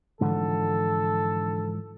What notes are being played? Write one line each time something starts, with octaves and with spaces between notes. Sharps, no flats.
G#2 D3 E3 F3 A4